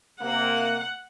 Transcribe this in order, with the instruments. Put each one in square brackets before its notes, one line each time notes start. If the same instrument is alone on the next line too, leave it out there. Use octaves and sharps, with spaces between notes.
[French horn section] C3 A#3 [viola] F#5